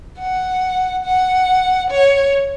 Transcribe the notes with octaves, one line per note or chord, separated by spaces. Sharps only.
F#5
F#5
C#5